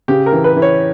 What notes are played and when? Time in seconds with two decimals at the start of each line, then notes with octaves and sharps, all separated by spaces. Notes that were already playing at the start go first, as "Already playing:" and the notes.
0.08 C#3 G4
0.26 A#4
0.32 E3
0.44 B4
0.57 E3
0.62 C#5